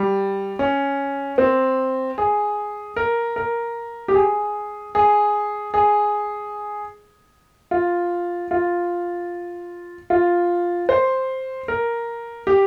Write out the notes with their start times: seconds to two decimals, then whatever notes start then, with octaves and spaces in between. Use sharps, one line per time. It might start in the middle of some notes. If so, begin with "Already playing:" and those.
Already playing: G3
0.59 C#4
1.38 C4
2.18 G#4
2.96 A#4
3.36 A#4
4.08 G4
4.15 G#4
4.95 G#4
5.74 G#4
7.71 F4
8.51 F4
10.10 F4
10.89 C5
11.68 A#4
12.47 G4